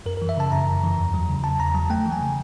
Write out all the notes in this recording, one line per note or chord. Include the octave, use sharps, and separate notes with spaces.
F#2 A#4
E3 A#4
E5
C#3 A5
F#2 A#5
F#2
E3
E2
F#3
C#3
E2 A5
E2 A#5
F#3 A5
A3 G5
E3
G#5
C#3